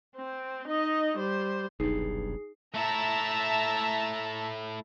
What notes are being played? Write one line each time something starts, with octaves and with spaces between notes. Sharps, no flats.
C4
D#4 D#5
G3 C5
F1 B1 G2 D#4 G#4 C7
A3 E4 E5 A5 A#5